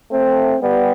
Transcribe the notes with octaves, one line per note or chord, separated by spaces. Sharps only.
A3 C4
G3 B3